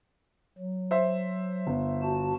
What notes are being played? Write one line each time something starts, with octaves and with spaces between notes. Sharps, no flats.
F#3
C5 E5
G1
F#4 A5